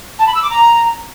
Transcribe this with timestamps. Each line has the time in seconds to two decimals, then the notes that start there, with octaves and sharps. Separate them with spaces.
0.19 A5
0.27 B5
0.35 E6
0.42 D6
0.50 A#5